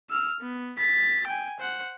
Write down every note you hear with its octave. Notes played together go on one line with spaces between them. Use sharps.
E6 F6
B3
A6 B6
G5 G#5
C5 F#5